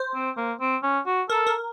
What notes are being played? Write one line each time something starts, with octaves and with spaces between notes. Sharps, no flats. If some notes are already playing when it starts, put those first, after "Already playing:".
Already playing: C5
C4
A#3
C4
C#4
F#4
A4 A#4
A#4